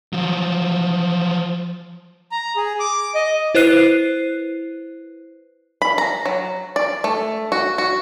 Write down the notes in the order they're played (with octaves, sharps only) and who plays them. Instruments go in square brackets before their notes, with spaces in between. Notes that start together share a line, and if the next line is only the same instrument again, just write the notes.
[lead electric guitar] F3 F#3
[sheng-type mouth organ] A#5
G#4
D6
D#5
[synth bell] E4 B4 C5 F#6 C7 D#7
[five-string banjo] B5
A#5
F#3
D5
A3
F#4
F#4